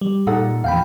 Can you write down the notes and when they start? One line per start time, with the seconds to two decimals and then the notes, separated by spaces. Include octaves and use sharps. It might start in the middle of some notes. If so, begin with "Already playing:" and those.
0.01 G3
0.27 A#2 D#4 A4 F#5
0.64 E2 A#2 F3 F5 G5 B5